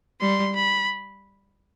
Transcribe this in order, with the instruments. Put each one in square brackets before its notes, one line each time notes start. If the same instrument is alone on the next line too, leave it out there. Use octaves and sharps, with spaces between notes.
[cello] G3 [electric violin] C6
[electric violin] B5